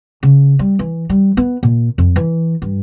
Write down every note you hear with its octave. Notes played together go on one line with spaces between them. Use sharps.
C#3
G3
E3
G3
B3
A#2
F2
E3
G2